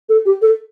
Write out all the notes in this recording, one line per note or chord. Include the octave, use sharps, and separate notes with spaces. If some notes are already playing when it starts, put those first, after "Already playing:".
A4
G4
A4